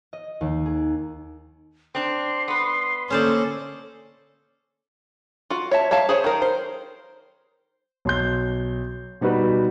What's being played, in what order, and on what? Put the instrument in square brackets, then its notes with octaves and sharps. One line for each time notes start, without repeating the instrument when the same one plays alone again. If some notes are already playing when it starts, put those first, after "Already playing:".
[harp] D#5
D#2
G#4
[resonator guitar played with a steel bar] C4 D4 [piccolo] C6
[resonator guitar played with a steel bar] B3 B4
[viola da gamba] D3 A#3 A4 [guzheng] C#4 C5 D5 [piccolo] D#6
[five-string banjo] F4 F#4
C#5 E5 A5
C#5 E5 F5 A5
G#4 C5 C#5
D#3 A#4
C5
[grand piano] B1 C6 G6
B2 G3 D#4 F#4 B4